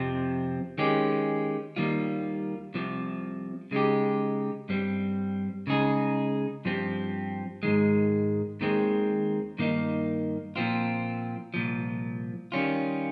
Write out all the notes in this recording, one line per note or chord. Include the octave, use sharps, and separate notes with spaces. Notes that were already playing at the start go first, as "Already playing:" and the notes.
Already playing: F2 C3 F3 C4
D#3 G#3 C#4 G4
D#2 D#3 G3 A#3 F4
C2 C3 F3
C#3 G#3 D#4 G4
G2 G3 C4
C#3 G#3 D#4 G#4
G2 F3 C4 G4
G#2 D#3 G#3
D#2 D#3 G#3 C4
G2 D#3 A#3 D#4
A#2 F3 C4 F4
C2 A#2 F3
D#3 G3 C#4 F4